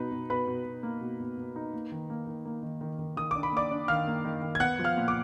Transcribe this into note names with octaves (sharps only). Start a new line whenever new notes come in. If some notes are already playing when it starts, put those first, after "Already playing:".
Already playing: B2 D#4 B4
B2
B2 B4 B5
B2
B2
A#3
B2
B2
B2
D#4
A#3
D#3
A#3
D#3
A#3
D#3
D#3
D#3
D#3 D#6
D4 D6
B5
A#3 D5 D6
D4
D#3 F5 F6
A#3
D#3
D#3
G#6
B3 F#5 F#6
F3
F5 F6
A#2
D6